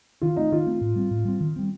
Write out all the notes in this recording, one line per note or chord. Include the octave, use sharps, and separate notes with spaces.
D#3 F4
A3 C4 D#4
D#3 F4
A3 C4
A2
G3 C4
A2
G3 C4
D#3
G3 C4